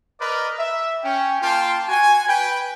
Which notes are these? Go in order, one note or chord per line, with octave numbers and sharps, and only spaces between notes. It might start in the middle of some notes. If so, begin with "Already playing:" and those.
A#4 B4 D5 D#5
E5
C#4 G5
A#3 F4 G5 A5 C6
F#4 G#5
B4 G5